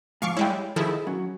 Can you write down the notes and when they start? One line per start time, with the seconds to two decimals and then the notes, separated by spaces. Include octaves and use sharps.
0.22 G#2 F3 F5 C#6 D6
0.37 G3 G#3 E4 C#5 G5
0.76 D#3 F3 E4 G#4 A4
1.07 F#3 C#4